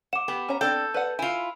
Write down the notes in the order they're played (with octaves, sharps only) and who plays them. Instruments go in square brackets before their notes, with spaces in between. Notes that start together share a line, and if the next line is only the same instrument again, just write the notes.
[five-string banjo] F#5 [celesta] D6 E7
[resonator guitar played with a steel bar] B3 [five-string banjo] G4
[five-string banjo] C#4 C#5 A#5
[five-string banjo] C4 D4 G5 [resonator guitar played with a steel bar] A4 [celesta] G6
[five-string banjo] B4 D5 F#5
[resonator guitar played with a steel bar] E4 F4 [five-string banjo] G#5